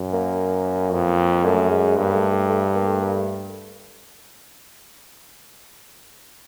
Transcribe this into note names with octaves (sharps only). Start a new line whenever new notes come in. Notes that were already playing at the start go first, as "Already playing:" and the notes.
Already playing: F#2
A#3
F2
F#2 A3
G#3
G2 A#3
A3
A3
A3
A#3
A3
A#3
A3